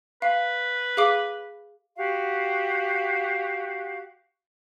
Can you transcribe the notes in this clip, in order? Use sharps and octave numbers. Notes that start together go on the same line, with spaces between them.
B4 F5
G#4 F5 D6
F#4 G4 F5